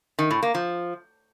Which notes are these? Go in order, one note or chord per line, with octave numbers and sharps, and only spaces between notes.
D#3
A2
A#3
F3